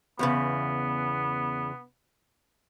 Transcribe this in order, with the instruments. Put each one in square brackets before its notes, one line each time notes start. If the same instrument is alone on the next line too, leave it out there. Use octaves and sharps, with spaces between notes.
[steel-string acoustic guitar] E2 A2 C#3 [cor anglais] B3